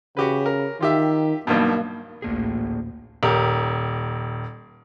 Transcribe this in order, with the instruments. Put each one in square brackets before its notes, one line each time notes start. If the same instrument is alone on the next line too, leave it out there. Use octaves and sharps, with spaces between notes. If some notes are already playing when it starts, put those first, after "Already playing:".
[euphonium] C#3 [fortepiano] F#4 G4 B4
[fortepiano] A#4
[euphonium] D#3 [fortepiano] F4 G4 E5
[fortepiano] B1 G2 B2 [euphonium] A#3
[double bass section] A1 D2 [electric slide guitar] A#2 A#3 G#4
[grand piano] D#1 G4 A#4